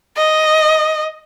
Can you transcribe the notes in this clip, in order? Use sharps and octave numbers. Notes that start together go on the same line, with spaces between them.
D#5